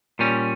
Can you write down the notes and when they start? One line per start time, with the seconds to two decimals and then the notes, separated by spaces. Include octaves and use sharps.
0.19 A#2 G3 C#4